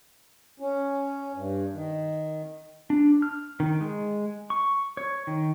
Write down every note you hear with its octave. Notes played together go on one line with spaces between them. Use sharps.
C#4
G2
D#3
D4
F6
D#3
G#3
C#6
C#5
D#3